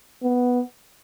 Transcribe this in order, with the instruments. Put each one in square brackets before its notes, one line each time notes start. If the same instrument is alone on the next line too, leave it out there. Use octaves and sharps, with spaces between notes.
[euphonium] B3